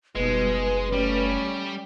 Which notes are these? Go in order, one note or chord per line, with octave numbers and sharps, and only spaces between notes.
F#1 B2 G3 G#3 D#4 B4
G3 A3 C#4